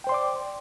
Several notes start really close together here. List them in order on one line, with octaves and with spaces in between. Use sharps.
G5 C5 C6 D5 D6